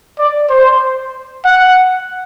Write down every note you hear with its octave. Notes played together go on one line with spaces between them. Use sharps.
D5
C5
F#5